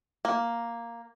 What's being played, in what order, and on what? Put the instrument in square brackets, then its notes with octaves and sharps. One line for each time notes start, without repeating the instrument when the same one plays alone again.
[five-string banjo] A#3